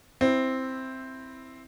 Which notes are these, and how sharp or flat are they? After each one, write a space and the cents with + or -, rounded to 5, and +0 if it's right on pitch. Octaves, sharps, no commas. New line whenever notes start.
C4 +0 E4 +0